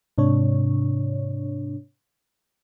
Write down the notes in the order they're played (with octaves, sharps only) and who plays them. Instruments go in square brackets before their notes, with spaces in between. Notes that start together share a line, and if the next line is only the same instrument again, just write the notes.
[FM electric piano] G#2 C3 D4 C#5